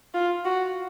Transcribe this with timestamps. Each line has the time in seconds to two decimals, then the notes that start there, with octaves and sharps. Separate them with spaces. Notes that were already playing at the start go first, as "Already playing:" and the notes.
0.14 F4
0.45 F#4